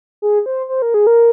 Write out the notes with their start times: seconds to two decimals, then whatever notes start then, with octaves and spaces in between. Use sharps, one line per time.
0.22 G#4
0.46 C5
0.69 C5
0.82 A#4
0.94 G#4
1.07 A#4